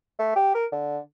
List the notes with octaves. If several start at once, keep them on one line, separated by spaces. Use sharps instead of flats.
A3
G4
A#4
D3